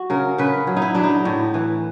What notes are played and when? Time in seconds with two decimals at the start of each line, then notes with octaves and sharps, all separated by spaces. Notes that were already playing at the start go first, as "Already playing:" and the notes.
Already playing: F#4
0.10 C#3 A#4
0.38 C#3 B4
0.67 F#3
0.77 D#4
0.82 E4
0.95 F#3 D4
1.03 D#4
1.25 A2
1.54 E3